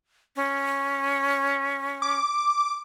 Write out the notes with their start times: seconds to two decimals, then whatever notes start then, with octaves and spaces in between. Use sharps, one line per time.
0.36 C#4
2.02 D6